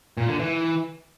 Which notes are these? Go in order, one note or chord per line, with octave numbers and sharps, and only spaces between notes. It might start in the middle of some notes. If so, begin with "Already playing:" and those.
A#2
D3
E3